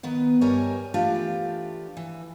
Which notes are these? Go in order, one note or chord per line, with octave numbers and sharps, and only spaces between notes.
D#3 B3 B4
G2 G3 A#4 C#5 D#5 G#5
E3 A3 D4 F4 G4
E3